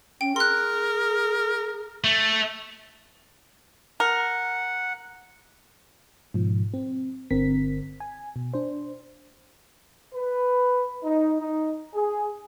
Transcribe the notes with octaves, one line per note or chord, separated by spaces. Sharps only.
C#4 G5
G#4 A#4 C6 F#6
A3
A#4 F#5
G#2 B2 F3
C4
G1 D3 C4 A#4 B6
G#5
B2
D4 C5
B4
D#4
D#4
G#4